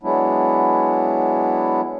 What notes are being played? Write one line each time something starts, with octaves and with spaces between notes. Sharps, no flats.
F#3 G#3 B3 D4 E4